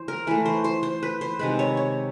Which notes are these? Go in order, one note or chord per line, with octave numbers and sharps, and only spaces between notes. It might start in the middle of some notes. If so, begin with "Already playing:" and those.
Already playing: E3 C5
A#4
E3 A3 B4
C5
C5
C5
B4
C5
C3 D#3 G#3 B4
C#5
C#5